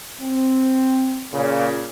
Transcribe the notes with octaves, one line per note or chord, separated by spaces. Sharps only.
C4
A#2 C#3